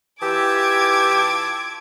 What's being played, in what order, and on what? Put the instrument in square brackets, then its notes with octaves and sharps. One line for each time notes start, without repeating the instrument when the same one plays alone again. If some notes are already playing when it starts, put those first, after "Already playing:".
[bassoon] E3 [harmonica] F4 A5 E6 [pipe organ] G4 [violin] D6 G#6